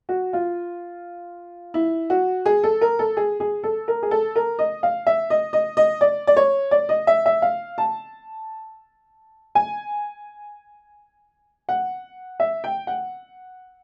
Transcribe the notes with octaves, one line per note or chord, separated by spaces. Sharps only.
F#4
F4
E4
F#4
G#4
A4
A#4
A4
G#4
G#4
A4
A#4
G#4
A4
A#4
D#5
F5
E5
D#5
D#5
D#5
D5
D5
C#5
D5
D#5
E5
E5
F5
A5
G#5
F#5
E5
G5
F#5